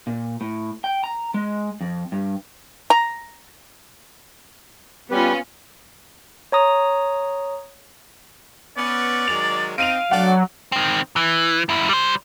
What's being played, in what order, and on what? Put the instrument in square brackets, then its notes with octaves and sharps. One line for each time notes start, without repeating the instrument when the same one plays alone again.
[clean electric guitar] A#2
A2
G5
A#5
G#3
F2
G2
[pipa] A#5
[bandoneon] G3 G4 B4 [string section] B3 C#4 F4
[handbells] C#5 A#5 D#6
[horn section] B3 C#4 [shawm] D5
[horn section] D#3 F#3 G#3 [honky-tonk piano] F7
[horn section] C4 D#4 [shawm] F5 [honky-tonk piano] D7 D#7 F7
[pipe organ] F#3 [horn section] A3 D4 D5 [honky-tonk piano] F#5
[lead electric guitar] D#3 C4
E3
F#2 E4
G3 C5